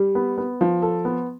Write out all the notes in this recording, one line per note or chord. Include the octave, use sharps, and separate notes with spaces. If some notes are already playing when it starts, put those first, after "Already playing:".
Already playing: G3
B3
B3
F3
A4
B3